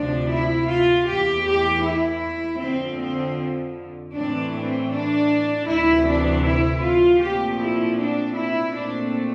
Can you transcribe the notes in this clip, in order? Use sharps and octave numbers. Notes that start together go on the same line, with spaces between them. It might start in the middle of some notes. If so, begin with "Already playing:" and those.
Already playing: D2 C3 F3 D4
E4
F4
E2 E3 A3 G4
G4
E4
F2 D3 F3 C4
C4
A2 E3 A3 C4 D4
C4
D4
D2 C3 E3 E4
D4
E4
F4
A#2 F3 A3 C4 G4
E4
D4
E4
A#2 A3 C4 D4